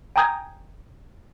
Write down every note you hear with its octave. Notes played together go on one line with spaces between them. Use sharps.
G5 G#5 A#5 D#6 G6 G#6